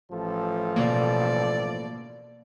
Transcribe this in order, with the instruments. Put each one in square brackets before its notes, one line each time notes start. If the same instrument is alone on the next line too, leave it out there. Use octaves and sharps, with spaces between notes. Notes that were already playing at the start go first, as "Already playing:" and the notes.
[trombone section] A1 F3 A4
[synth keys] B2 D3 A#3 [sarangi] D5